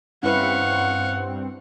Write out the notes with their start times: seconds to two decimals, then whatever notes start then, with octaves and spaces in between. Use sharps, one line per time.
0.23 G2 C4 C#4 E4 B4 F5 F#5 C#6